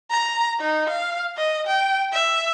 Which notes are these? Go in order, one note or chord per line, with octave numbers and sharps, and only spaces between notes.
A#5
D#4
F5
D#5
G5
E5